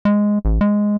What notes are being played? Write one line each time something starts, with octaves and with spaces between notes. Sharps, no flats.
G#3
A1
G#3